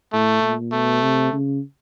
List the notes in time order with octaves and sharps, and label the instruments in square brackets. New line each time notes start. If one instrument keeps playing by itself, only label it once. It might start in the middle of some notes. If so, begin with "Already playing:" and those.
[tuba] A2 [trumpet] A3
[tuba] A#2
[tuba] B2 [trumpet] A3
[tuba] C3
C#3